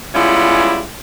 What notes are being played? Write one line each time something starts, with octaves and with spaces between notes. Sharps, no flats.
G3 G#3 B3 C#4 E4 F4